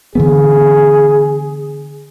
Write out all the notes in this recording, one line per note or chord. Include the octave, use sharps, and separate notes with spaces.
D3 E3 B3 G#4